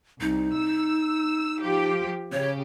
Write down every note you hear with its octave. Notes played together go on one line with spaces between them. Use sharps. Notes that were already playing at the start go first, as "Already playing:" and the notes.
C2 D#4
E6
F3 G4
C#3 G4 C#5